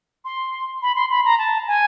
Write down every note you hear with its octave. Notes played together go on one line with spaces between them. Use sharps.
C6
B5
C6
B5
A#5
A5
G#5